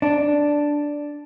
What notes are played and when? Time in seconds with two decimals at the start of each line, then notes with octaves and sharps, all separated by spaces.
0.02 D4